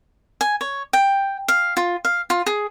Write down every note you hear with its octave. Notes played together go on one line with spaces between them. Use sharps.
G#5
C#5
G5
F5
F4
F5
F4
G#4